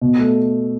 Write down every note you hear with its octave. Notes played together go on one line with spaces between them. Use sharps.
B2
A3